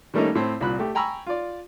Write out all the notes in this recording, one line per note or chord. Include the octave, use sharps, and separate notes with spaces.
D#3 G3 A3 A#3 C#4 D#4
A2 C4
C2 A#2 B5 F#6
A3 G4
G5 G#5 A#5 B5 C#6 E6
F4 D5